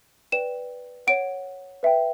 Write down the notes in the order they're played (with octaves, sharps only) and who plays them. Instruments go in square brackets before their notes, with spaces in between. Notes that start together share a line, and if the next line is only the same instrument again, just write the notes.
[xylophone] B4 D5 G5 E7
C#5 F#5 D7
B4 E5 G5